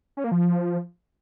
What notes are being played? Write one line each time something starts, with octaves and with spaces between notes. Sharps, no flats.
C#4
A#3
F3